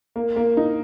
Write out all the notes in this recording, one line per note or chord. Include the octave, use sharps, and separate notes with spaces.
A#3
A#3
D#4